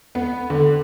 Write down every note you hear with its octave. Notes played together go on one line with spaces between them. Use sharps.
B3
D3